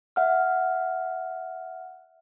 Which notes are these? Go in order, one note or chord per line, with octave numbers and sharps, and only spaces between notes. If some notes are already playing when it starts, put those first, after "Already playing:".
E5 F#5 F6